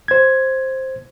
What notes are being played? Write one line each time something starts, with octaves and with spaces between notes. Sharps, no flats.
C5 G#6